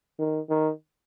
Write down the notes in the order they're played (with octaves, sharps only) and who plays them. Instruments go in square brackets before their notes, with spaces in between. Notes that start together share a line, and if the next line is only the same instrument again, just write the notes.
[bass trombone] D#3
D#3